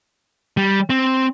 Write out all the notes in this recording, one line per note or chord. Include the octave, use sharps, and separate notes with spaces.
G3
C4